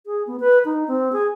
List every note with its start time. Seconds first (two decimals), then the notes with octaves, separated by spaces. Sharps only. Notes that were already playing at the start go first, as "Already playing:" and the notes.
0.06 G#4
0.27 B3
0.40 B4
0.65 D#4
0.88 C4
1.13 G#4